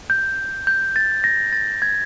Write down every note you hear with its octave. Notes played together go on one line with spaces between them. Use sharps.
G6
G6
A6
A#6
A6
G#6